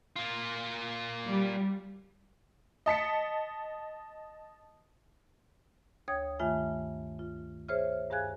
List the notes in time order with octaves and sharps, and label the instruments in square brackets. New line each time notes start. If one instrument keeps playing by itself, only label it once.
[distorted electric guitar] A#3 F4
[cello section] G3
[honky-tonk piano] D#5 A5 B6 C#7
[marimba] D2 C#5 G5 D#6 G#6
G2 D#3 A3 F4 E5 G#5
F4
G#4 C5 C#5 E5 F6
G2 G#4 F5 G#5 F#6 G#6